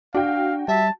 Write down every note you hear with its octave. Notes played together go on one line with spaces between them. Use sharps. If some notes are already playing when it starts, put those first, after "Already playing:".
D4 F#4 F5 G5
G3 E5 A5